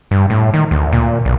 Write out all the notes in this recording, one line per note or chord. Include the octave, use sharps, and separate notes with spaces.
G2
A2
D#3
D2
A#2
B1